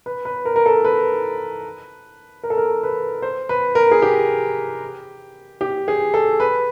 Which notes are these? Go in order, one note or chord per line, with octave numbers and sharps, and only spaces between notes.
B4
B4
A#4
A#4
A4
B4
A#4
A4
A#4
B4
C5
B4
A#4
G#4
G4
G4
G#4
A4
B4